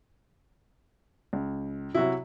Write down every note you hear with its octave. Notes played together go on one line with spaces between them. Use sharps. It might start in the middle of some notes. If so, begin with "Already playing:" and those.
C#2
C3 F#3 E4 F#4